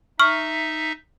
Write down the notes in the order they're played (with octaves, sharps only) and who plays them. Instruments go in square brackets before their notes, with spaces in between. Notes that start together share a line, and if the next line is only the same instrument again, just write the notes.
[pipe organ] D#4 E5 [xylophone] C#6 F6